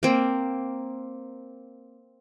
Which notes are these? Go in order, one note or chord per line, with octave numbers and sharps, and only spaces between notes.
A#3 C4